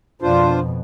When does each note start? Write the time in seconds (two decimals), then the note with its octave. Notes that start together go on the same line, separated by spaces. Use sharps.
0.22 F2 B2 D4 F4 C5